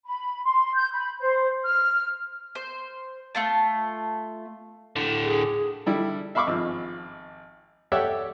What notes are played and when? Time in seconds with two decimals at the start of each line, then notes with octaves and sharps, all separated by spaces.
0.06 B5
0.45 C6
0.74 G6
0.93 B5
1.20 C5
1.64 F6
2.55 C5
3.35 A3 F4 A5
4.96 A2 D3
5.24 G#4
5.86 D3 G3 E4
6.35 E5 F5 B5 C#6 D6 E6
6.47 G#1 F3 E6
7.92 G4 A4 C#5 D5 E5 F#5